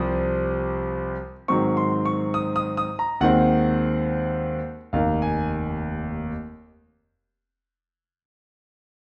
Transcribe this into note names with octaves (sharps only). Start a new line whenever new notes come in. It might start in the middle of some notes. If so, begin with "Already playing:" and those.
Already playing: C2 C3 F3 C4 D#6
G#2 D#3 F#3 C4 C#6
C6
C#6
D#6
D#6
D#6
A#5
D#2 D#3 G#3 C4 F#5
F1 D#2 D#3 A#3 F5
G#5